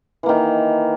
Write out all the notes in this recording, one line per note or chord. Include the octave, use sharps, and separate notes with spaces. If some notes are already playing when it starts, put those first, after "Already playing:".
D#3 E3 A#3